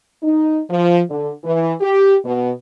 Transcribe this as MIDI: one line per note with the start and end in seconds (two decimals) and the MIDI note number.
0.22 0.59 63
0.70 1.00 53
1.08 1.30 50
1.43 1.74 52
1.80 2.15 67
2.24 2.51 47